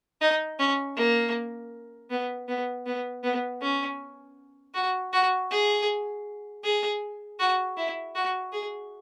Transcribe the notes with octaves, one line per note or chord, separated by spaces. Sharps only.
D#4
C#4
A#3
B3
B3
B3
B3
C#4
F#4
F#4
G#4
G#4
F#4
E4
F#4
G#4